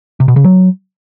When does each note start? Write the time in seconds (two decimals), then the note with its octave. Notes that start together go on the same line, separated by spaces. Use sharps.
0.20 C3
0.28 B2
0.36 C#3
0.44 F#3